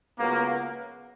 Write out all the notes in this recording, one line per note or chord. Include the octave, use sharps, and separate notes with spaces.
C#2 C#3 F#3 A#3 B3